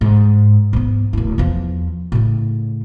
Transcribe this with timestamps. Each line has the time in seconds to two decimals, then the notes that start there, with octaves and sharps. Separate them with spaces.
0.01 G#2
0.73 G#2 B3
1.13 D1 E4
1.38 E2 F3
2.12 A2 C#3